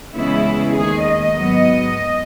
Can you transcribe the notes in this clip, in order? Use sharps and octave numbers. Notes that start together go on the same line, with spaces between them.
E2 C#3 G#3 B3 E4
D#2 D#3 G#3 G#4
D#5
G#2 F#3 B3